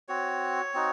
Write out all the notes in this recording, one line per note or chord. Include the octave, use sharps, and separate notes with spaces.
C4 F#4 C#5
C4 D#4 F#4